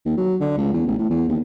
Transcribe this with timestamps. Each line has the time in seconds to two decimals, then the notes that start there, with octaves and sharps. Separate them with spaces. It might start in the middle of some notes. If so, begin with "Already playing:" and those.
0.06 D#2
0.17 F#3
0.40 D3
0.57 C#2
0.73 E2
0.87 A1
0.98 A2
1.10 E2
1.28 D#2